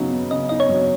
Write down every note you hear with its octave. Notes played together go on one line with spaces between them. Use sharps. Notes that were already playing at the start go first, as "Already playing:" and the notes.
Already playing: C#3 F#3 B3 D#4
B3
C#3 D#5
D#4 D#5
C#5
F#3